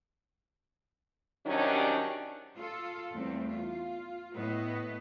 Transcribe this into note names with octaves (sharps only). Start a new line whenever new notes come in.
C3 D#3 F#3 G3 C#4 D4
F4 A4
E2 G3 A3 C4
F4
A2 B3 B4 D#5